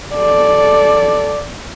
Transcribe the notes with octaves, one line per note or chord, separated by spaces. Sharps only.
A4 D5